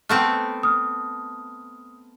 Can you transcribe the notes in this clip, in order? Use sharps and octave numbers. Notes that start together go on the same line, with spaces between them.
A3 B3 C4 F6
D#6 F6